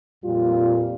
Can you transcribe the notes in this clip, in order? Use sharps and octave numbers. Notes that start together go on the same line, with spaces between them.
F2 A#2 G3 F4